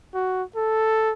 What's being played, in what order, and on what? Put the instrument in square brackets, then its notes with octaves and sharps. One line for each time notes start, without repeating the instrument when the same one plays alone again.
[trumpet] F#4
A4